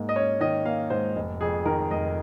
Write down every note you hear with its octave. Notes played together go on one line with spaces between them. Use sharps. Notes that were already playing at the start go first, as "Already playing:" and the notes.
Already playing: G#2 A#3
D#5
C#4 C#5
D#3 D#5
A#3 F5
G#2 C5
F1
F2 G#4
D#3 A#4
F1 D#5